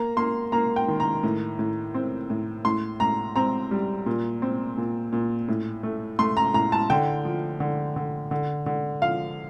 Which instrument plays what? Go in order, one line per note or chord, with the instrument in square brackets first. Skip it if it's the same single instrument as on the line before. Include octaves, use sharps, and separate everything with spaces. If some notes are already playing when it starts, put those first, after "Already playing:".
Already playing: [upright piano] A#3 A#5
A#3 C6
A#3 A#5
G5
D#3
A#5
A2
A2
C4
A2
A2 C6
A2 A#5
C4 A#5
G3
A#2
C4
A#2
A#2
A2
A3
A3 C6
A#5
A2 A#5
A5
D3 G5
F3
D3
D3
D3
D3
F3 F5